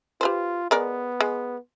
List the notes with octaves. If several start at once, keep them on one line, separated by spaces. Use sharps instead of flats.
F4 G4 B4 C5
G#3 B3 A#4 D5
G#3